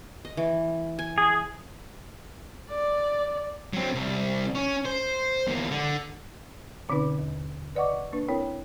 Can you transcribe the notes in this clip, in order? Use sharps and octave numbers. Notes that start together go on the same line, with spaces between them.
D#5
E3
G#5
G#4
D5
F#3 C4
C2
C#4
C5
E2 A#3
D3
B2 D3 C4 C#4 D#4 B4
D#2
B4 D5 D#5 F#5 C#6 D6
A#3 D4 B4
C4 E4 A#4 C#5 G5